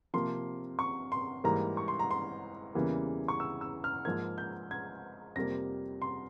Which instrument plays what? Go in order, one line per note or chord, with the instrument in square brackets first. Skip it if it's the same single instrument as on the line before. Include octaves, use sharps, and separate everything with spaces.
[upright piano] C3 F3 A#3 C6
C#6
C6
G#2 E3 G3 A#3 A#5
C#6
C6
A#5
C6
E2 C#3 E3 G3 A#3
C#6
E6
E6
F6
G#2 F3 A#3 G#6
G6
G#6
F2 C3 G3 A#3 A#6
C6